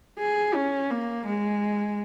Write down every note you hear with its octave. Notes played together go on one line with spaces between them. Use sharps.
G#4
C#4
A#3
G#3